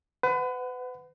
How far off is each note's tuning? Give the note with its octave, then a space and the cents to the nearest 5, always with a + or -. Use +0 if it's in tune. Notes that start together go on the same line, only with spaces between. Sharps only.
B4 +35 F#5 +0